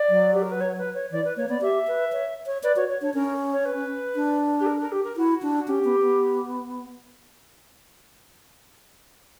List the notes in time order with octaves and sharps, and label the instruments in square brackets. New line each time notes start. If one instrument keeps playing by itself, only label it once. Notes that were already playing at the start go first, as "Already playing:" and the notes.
Already playing: [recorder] D5
[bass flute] F#3
[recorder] G4
A#4
B4
C#5
B4
C#5
[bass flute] E3 [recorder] D5
[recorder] B4
[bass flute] A#3 [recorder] C#5
[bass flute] B3 [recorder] D5
[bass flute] G4 [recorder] E5
[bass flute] B4
C#5
C#5
[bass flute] B4 [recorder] D5
[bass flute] F#4 [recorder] C#5
[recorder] C#5
[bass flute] D4 [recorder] C#5
[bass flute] C#4 [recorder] A#4
[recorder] C#5
B4
[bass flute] D4
[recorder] G4
A#4
A#4
G4
A#4
[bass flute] E4 [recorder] F#4
[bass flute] D4
[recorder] F#4
[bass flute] C#4 [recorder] G4
[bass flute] B3
B3